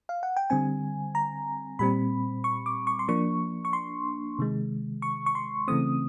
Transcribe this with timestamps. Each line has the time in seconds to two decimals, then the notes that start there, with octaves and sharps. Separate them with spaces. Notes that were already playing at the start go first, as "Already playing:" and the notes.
0.09 F5
0.23 F#5
0.37 G5
0.50 D3 G3 C4 G#5
1.15 A#5
1.79 A#2 G3 C4 B5
2.44 C#6
2.66 D6
2.87 C#6
2.99 C6
3.08 F3 A#3 D4 C#6
3.65 C#6
3.73 C6
4.39 C3 D#3 G#3
5.02 C#6
5.26 C#6
5.35 C6
5.68 C#3 E3 A3 C4 D#6